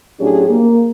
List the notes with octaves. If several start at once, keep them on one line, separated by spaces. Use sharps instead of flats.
A2 F#3 C#4 D4 G4 G#4
A#3